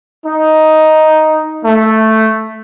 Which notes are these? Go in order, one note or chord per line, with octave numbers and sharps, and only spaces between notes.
D#4
A3